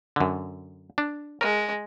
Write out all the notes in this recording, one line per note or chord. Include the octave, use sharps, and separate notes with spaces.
F#2 D3
D4
G#3 A#4